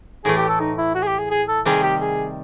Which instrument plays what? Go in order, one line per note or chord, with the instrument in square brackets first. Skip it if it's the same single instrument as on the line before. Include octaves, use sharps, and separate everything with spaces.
[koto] A2 E3 A3 [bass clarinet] G#4
[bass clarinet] G4
A4
D#4
E4
F#4
G#4
G4
G#4
G#4
A4
[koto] C3 D#3 G3 [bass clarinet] G#4
[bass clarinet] G4
G#4